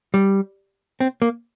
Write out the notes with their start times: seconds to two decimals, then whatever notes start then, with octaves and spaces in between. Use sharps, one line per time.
0.14 G3
1.00 C4
1.22 A#3